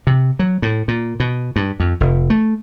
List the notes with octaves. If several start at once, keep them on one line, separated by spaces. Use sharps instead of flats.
C3
F#3
A2
A#2
B2
G2
F2
F1
A3